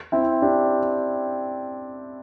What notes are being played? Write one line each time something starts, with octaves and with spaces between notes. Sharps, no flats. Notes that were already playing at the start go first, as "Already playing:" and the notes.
C4 E4
D4 G4